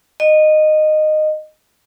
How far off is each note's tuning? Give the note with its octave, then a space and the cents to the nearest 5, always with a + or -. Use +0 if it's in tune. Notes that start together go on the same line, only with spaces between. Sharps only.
D#5 -15